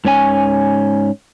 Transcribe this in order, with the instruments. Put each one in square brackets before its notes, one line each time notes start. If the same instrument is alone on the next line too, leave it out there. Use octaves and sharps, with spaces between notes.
[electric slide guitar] G#2 C#4 G#5